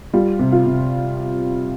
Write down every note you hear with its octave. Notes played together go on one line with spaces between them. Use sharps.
G3 F4
C3
F4
C3